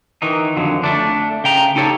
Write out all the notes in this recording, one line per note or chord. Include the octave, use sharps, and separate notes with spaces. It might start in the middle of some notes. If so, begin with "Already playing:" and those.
D#3 E3 D#4
F2 D3 F#3
A3 D4
C#3 G5 A#5
D#4 G4 A4 C#5